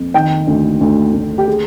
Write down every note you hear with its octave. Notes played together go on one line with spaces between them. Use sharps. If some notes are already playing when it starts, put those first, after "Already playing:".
Already playing: F2
D#3 G5
D2
D2
D2
G4
G#4